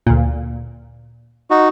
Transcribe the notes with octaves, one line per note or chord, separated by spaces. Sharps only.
D2 A#2
D#4 F#4